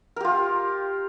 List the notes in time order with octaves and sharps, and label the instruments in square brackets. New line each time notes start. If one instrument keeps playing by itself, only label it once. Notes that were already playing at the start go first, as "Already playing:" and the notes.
[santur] A#4
G4
F4